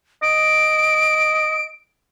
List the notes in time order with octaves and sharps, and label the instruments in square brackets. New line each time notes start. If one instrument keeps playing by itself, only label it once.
[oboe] D#5 [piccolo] D7